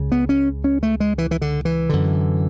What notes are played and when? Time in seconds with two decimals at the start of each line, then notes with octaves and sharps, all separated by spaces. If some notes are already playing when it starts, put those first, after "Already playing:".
Already playing: C#2 C#3
0.12 B3
0.29 C#4
0.64 C#4
0.83 A3
1.00 G#3
1.18 E3
1.31 E3
1.42 D3
1.65 E3
1.89 F#2 D3